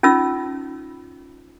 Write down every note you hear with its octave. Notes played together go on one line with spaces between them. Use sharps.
C#4 D#4 F4 E6